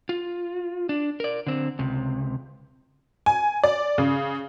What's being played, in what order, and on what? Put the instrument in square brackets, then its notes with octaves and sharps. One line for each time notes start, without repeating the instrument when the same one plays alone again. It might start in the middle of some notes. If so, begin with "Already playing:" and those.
[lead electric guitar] F4
D4
A#4 D5
D3 C4
C#2 C3
[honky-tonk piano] G#5
D5
C#3